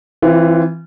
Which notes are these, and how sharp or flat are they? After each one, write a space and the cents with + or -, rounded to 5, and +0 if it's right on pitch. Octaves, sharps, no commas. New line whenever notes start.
E3 +0 C4 +0 F4 -30